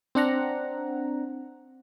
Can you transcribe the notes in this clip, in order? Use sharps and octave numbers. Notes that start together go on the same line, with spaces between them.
C4 D4 F#5 A#5